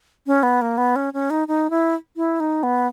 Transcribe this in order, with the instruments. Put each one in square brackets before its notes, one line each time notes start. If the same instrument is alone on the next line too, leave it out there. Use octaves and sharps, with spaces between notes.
[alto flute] C#4
B3
A#3
B3
C#4
C#4
D#4
D#4
E4
E4
D#4
B3